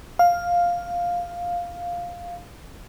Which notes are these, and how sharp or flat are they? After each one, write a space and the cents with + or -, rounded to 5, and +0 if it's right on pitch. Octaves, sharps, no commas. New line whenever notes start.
F5 +5